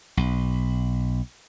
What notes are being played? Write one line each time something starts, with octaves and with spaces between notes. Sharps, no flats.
B1